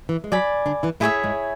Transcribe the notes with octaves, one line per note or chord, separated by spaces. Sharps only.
E3
G#3
F#3 D5 G#5 B5
D3 D4
E3 E4
A2 A3 E4 G#4 C#5 E5
G#2 G#3